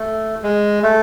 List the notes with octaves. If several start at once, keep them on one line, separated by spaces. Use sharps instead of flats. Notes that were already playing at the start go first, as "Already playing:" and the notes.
Already playing: A3
G#3
A3